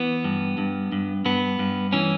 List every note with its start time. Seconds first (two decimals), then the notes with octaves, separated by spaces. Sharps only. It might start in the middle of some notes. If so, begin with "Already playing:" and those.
Already playing: E3 B3
0.24 G2
0.58 G2
0.92 G2
1.25 G2 B3
1.59 G2
1.93 E3 C#4